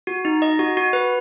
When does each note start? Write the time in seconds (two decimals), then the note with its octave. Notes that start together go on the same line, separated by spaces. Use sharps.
0.07 F#4
0.25 D#4
0.42 D#5
0.59 F#4
0.77 F#4
0.93 B4